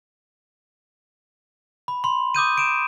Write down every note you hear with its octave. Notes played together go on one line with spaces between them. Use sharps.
B5
B5 C6
D6 D#6 G6 D#7
D7 E7